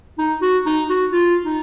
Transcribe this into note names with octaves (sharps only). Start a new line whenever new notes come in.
D#4
F#4
D#4
F#4
F4
D#4